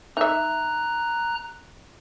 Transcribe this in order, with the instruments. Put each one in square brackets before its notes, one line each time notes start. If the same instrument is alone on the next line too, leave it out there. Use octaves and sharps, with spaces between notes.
[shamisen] D#4 E5 [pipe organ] A#5 F#6